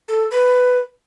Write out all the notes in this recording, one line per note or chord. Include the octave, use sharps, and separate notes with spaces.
A4
B4